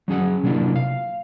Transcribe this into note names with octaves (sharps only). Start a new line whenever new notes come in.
F#3 C#4 G#4 F#5
C3 F#3 A#3 D4 E4 F4
F5